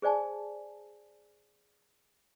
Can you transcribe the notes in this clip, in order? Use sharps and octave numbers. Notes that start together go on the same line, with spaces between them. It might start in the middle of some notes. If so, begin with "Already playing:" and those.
G#4 C5 D5 G#5 A5